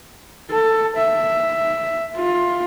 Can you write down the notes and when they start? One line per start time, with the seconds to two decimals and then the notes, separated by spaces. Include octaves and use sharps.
0.51 A4
0.97 E5
2.17 F4